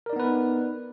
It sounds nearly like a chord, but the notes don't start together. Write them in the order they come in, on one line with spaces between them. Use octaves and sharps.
A#4 D5 D#4 B3 B4